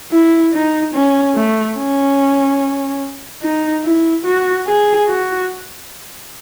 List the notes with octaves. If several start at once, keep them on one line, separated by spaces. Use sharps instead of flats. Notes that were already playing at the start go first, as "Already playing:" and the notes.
E4
D#4
C#4
A3
C#4
D#4
E4
F#4
G#4
F#4